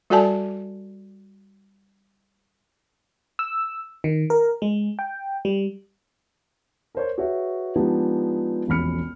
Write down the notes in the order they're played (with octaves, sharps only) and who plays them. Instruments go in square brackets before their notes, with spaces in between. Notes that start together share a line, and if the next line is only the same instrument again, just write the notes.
[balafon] G3 F#4 A4 D5 G#5 A5
[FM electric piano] E6
D#3
A#4
G#3
G5
G3
[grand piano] A#4 C5 C#5
F#4 G#4 B4 C#5 E5
F3 G#3 B3 D4 D#4 G4
E1 A1 F2 B5 F6 C#7